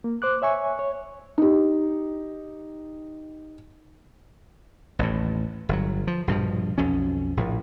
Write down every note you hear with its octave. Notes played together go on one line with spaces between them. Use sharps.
A#3
C5 D6 F#6
C#5 E5 G#5 C#6
C#5
D#4 G4
A1 D#2 A2
G1 F#3
F3
A#1 G2 B2 F3
B1 F2 B2 C#4
A#1 A2